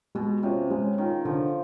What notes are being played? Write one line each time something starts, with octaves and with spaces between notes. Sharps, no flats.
B2 G#3
C3 C#4 F4
C#3 G#3
D#3 C#4 F4
D3 F3